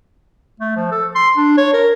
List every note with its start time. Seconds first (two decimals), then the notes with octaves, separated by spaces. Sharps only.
0.60 A3
0.76 F3
0.91 A4
1.15 C6
1.37 D4
1.57 C#5
1.74 A#4